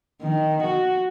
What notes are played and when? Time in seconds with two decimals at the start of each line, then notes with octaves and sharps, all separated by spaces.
0.21 D#3
0.63 F#4